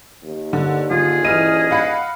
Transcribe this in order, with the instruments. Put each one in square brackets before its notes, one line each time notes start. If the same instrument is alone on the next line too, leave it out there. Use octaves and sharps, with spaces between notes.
[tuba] D#2
[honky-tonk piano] D3
[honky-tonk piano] D3 [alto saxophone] F4 [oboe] G#4
[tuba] D#1 [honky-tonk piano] E3 F6 D#7 [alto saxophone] D#5
[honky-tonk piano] F5 F#5 B5